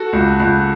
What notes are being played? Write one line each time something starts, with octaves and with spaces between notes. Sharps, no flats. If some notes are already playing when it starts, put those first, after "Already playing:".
Already playing: F#4 A4
C#2
C#2